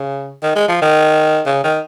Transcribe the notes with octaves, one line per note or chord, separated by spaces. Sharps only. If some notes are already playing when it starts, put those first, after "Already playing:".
Already playing: C#3
D#3
G#3
F3
D#3
C#3
D#3